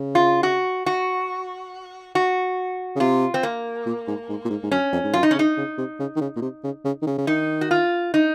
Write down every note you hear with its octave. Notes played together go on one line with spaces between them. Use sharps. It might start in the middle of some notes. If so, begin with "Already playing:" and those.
Already playing: C#3
F4
F#4
F#4
F#4
C#3
C3 F4
C4
A#3
A#2
G#2
G#2
A#2
G#2
G#2
F#2 C#4
F2
G#2
F#2 F4
D#4
C#4
C#3
D#4
C#3
C3
C#3
D#3
C#3
A#2
C3
C#3
C#3
D#3
C#3
C#3
D#3 D#4
F#4
F4
D#4